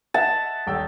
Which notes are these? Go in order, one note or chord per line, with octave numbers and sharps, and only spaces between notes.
D#5 E5 F#5 A5
D#1 G5 E6